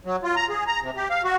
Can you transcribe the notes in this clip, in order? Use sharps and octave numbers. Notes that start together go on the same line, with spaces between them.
F#3
F4
A#5
G#4
A#5
C3
G4
F5
F#4